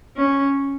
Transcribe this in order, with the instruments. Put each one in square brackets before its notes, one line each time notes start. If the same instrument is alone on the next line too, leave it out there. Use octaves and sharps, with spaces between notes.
[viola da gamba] C#4